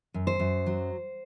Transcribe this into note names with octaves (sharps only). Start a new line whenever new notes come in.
F#2
C5
F#2
F#3